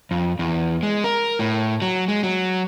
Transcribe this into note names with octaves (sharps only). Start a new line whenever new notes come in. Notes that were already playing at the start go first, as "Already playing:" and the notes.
F2
E2
G#3
A#4
A2
F#3
G#3
F#3